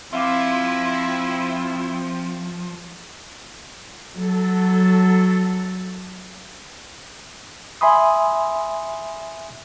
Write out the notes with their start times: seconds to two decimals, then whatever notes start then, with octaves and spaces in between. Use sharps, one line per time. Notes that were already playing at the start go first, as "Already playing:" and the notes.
0.13 F3 C4 E4 E5 F5 D6
4.17 F#3 A4
7.81 E5 G#5 B5 C6 D#6